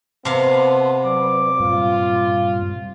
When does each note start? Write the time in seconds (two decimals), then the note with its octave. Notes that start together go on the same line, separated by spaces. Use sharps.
0.25 C3 B3 F5 A5 C6
1.05 F#3 B4 D5 D6
1.60 G2 A#2 G3 F4